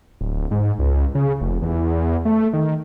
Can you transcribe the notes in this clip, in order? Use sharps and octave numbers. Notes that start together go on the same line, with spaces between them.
D1
G#2
C#2
C#3
F1
E2
A3
D#3